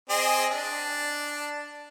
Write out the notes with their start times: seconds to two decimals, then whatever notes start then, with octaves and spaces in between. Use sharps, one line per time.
0.10 C4 G#4 D#5
0.51 D4